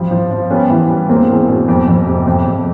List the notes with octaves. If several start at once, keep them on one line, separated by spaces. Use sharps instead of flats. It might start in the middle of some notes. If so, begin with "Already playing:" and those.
Already playing: F3 G3 C4
F3
F3
G3 B3 C#4
E3
G3
E1 A#3 C4
E2
B2
F2
F2
C3
F2
F2